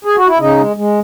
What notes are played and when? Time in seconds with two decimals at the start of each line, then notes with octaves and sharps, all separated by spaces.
0.05 G#4
0.16 F#4
0.27 E4
0.39 C#3 D#4
0.57 G#3
0.76 G#3